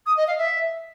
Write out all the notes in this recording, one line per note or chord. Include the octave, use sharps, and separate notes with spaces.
D#6
D#5
F5
E5